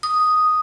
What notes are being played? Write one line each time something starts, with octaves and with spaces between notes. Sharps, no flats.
D#6